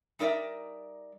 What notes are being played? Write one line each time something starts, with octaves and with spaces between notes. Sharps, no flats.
G3 D#4 A#4 D5 E5